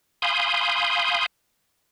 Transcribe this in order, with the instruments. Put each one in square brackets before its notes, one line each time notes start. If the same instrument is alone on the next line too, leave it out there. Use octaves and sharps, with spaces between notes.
[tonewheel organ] F5 G#5 B5 C6 D#6 G6